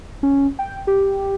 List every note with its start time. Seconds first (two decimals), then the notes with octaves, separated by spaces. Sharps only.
0.23 C#4
0.59 G5
0.87 G4